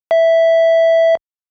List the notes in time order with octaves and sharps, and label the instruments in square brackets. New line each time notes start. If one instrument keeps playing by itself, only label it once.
[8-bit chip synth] E5